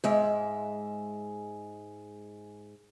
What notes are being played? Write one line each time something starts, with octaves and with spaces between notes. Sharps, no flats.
G#2 G#3 E5